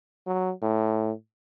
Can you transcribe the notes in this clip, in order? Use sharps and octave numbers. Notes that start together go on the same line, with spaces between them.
F#3
A2